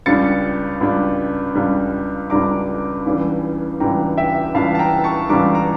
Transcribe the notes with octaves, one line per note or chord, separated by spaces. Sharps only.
C#2 C#3 G3 D4 A6 C#7
C#2 C#3 G3 D4
C#2 C#3 G3 D4
C#2 C#3 G3 D4 A#5 D6
C#2 C#3 E3 G3 D4
C#2 C#3 E3 G3 D4 G5 A#5
E5 G5
C#2 C#3 E3 G3 D4 F5 A5
A5
G5 A#5
A5 C#6
C#2 C#3 E3 G3 D4 A#5 D6
A#5